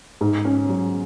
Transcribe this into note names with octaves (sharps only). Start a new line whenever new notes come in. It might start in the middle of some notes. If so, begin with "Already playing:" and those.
G#2
C#4
F#3